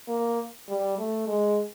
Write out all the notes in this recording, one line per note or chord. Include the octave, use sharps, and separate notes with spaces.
A#3
G3
A3
G#3